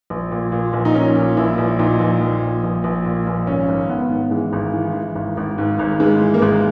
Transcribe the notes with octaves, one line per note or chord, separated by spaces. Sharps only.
A#1
A#2
A#2
A#1
D#4
A#2 C#4
A#2
A#1 E4
A#1
A#2 D#4
A#1
A#1
A#2
A#1
A#1
A#2
A#1
G#1 C#4
G#1
G#1 B3
G#2
E3 G#3
G#1
E3
E3
G#1
G#1
G#2
G#1
G#2 G#3
E3
A#3
G#1 G#3